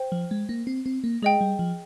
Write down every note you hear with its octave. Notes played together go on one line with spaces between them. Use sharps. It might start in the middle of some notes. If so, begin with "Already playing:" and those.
Already playing: C5 G5
F3
G#3
A#3
C4
C4
A#3
G#3 G#4 D#5 G5
G3
F3